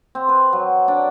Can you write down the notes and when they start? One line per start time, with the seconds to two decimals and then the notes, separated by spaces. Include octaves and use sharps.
0.15 C4
0.29 B4
0.53 F#3
0.88 D4